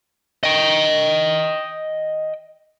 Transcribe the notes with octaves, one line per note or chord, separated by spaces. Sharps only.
D#5 G5